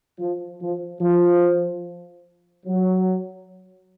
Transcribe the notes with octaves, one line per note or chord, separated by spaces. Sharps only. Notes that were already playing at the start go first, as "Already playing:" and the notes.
F3
F3
F3
F#3